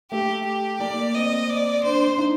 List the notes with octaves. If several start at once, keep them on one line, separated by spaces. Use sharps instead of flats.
A3 G4
G4
A#3 D5
C4 D#5
D5
D4 C5
D4
D#4